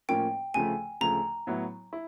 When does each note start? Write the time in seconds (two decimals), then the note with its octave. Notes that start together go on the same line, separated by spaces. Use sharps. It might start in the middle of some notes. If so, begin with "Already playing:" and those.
0.09 A2 F3 A#3 C#4 G5
0.54 D2 C#3 F3 A3 G#5
1.01 D2 C#3 F3 A3 A#5
1.47 A2 F#3 B3 E4
1.93 E4